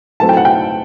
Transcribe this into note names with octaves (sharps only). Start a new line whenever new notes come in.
F#3 A3 C4 E4 A5
G5
F#5
G5